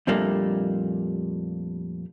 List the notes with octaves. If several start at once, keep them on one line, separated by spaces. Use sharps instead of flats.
F2 A#2 G3 A3 A#3 D4